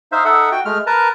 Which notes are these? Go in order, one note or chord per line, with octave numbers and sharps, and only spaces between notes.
D#4 C5 E5 F5
D#4 A4 E5 F#5
F#4 G5
G#3 A3 F6
A#4 B4 A5 A#5